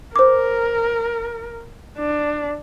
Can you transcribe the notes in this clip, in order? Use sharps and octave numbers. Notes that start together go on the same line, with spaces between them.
A#4 C5 D6
D4